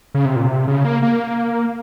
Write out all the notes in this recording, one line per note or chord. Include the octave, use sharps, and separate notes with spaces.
C#3
C3
A#2
C3
C#3
A#3
A#3